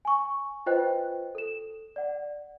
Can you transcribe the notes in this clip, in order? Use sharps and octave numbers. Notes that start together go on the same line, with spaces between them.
G#5 C#6
F4 B4 C5 D#5 G5 F#6
A4 E7
D5 F#5